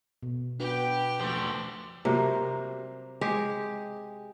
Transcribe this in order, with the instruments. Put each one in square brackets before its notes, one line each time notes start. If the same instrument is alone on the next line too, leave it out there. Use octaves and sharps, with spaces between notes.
[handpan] B2
[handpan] D4 F#4 B4 [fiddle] G4 G5
[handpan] F3 [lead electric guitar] A3 C5
[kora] C3 [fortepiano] F#3 G3 A#3
[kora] G#3 G4